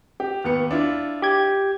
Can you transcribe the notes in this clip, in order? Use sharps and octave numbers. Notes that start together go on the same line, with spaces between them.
G4
D#2 B3 C#7
D4 E4 F4
G4 G#6